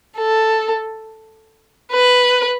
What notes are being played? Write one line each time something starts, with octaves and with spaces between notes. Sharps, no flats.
A4
B4